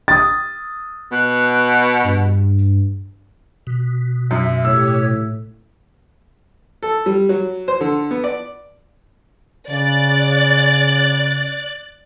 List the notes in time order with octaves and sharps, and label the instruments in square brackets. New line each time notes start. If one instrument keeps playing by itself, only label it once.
[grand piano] D#6 A6
[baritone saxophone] B2 [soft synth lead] F#6
[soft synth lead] G2
[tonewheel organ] B2
[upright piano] F#2 [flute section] E5
[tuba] A2 [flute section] G4 C#5 [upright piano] E6
[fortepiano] A4
G3
F#3
C5
D3
B3
D5
[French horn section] C#3 [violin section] D5 F#6 A6